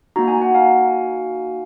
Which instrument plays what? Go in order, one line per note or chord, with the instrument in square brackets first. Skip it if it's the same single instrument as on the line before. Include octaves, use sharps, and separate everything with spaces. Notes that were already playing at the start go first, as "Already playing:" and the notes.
[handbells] A#3 D#4 F#4 A#5
G#5
F#5
F5 G#5